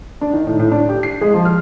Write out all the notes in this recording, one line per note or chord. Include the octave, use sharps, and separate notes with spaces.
D4
D#3
A2
A2
D4
G4
C7
G#3
F3
F6